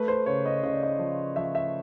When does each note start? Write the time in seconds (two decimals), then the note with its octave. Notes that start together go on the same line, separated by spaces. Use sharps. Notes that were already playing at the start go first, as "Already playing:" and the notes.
Already playing: A3 B4
0.08 C5
0.26 C#3 C#5
0.46 D#5
0.63 C#3 D#5
0.73 D5
0.83 D#5
0.99 F3
1.36 F3 E5
1.55 E5